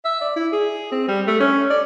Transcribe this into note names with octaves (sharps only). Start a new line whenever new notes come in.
E5
D5
E4
G#4
C4
G3
A3
C#4
D5